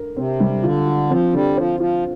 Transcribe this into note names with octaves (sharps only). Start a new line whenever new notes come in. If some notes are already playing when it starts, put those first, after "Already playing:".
Already playing: A#4
C3 C4
G3
D3 F4
F4
F3 C4
D3 G3
F3 C5
F3 F4